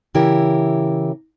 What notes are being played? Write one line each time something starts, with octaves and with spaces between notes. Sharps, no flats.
C#3 E3 E4 G4 A#4